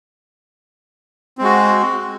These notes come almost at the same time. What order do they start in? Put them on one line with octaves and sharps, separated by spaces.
C4 G#3 F#4